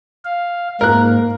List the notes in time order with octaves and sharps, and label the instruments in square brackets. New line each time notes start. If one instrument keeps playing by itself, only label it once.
[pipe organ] F5
[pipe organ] G#2 A#3 [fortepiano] A#4 F#6